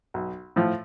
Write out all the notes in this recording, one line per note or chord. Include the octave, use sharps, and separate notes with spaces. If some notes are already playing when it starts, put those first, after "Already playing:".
B1
A2 F3